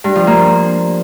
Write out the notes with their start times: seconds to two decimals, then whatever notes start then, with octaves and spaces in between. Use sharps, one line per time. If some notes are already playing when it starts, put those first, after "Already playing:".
0.04 G2
0.16 F3
0.27 A#3